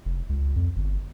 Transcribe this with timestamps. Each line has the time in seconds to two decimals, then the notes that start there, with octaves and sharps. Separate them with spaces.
0.05 F1
0.29 C#2
0.56 F2
0.76 G1